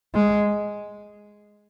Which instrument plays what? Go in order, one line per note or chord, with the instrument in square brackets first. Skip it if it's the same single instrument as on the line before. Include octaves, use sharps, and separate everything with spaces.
[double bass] G#3